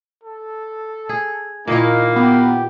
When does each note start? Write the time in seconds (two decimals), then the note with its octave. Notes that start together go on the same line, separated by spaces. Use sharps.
0.24 A4
1.09 G#4
1.68 A#2 D#3 A#3 D#4 E4
2.16 B3 G4